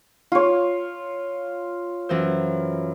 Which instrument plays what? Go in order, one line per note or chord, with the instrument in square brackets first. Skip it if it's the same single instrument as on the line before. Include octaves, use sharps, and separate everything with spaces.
[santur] F4 C#5
[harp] F#2 E3 C5